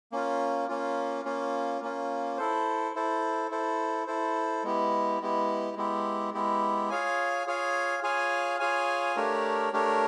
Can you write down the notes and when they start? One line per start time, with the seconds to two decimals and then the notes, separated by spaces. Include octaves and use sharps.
0.12 A#3 C#4 F4
0.69 A#3 C#4 F4
1.25 A#3 C#4 F4
1.82 A#3 C#4 F4
2.38 E4 A4 C5
2.95 E4 A4 C5
3.51 E4 A4 C5
4.07 E4 A4 C5
4.63 G#3 B3 E4 G4
5.21 G#3 B3 E4 G4
5.77 G#3 B3 E4 G4
6.34 G#3 B3 E4 G4
6.90 F4 G#4 C#5 F5 G#5
7.47 F4 G#4 C#5 F5 G#5
8.03 F4 G#4 C#5 F5 G#5
8.60 F4 G#4 C#5 F5 G#5
9.16 A3 D4 G4 A#4 C#5
9.73 A3 D4 G4 A#4 C#5